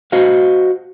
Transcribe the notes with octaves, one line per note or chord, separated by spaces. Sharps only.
F#4 C5 D#5 F5